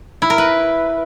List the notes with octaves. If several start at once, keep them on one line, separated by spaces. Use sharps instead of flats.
E4
A#4
B4